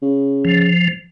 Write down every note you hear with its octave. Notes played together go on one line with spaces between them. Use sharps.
C#3
F3